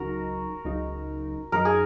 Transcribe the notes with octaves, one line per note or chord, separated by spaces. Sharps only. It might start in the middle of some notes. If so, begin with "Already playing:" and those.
Already playing: C#2 C#3 F#3 D#4 F#4 A#4
C#2 C#3 F#3 D#4
F#2 F#3 D#4 A#4
G#4